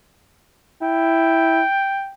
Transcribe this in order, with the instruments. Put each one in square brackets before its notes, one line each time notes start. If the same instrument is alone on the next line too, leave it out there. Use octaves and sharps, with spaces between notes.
[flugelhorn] E4 [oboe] G5